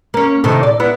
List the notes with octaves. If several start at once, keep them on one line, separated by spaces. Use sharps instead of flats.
A#3 C#4
A2 C3 D#3
D5
B3 E4